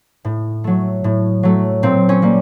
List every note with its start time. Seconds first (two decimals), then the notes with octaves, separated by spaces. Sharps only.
0.25 A2
0.64 F#3 A3
1.04 A2
1.43 F#3 A3
1.83 A#2 C4
2.09 C#4
2.22 G3 A#3